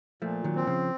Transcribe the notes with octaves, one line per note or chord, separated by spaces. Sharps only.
A#2 F3 A3
D#3 F#3
C4
C#3 F3